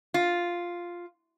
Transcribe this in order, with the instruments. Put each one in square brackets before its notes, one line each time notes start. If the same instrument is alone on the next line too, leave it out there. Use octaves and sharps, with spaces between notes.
[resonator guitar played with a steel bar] F4